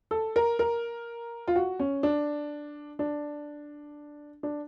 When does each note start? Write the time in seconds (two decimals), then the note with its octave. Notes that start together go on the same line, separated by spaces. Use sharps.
0.11 A4
0.36 A#4
0.59 A#4
1.48 F4
1.56 F#4
1.79 C#4
2.03 D4
2.99 D4
4.43 D4